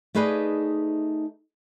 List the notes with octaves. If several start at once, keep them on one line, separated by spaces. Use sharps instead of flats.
A3 D#4 G#4 B4 D5 D#5